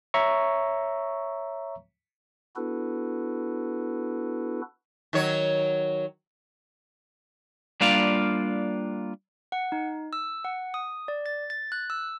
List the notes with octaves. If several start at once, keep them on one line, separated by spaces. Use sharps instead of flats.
C#5 E5 A#5 C#6
B3 D4 E4 F#4 A4 B4
D#3 F#3 C#5
G3 A#3 D4 F4 D5 F5
F#5
D#4
E6
F#5
D#6
D5
A6
A6
F#6
E6